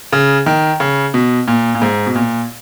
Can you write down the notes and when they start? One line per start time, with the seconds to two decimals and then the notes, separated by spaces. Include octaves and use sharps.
0.13 C#3
0.46 D#3
0.80 C#3
1.14 B2
1.48 A#2
1.75 A#2
1.82 G#2
2.07 B2
2.15 A#2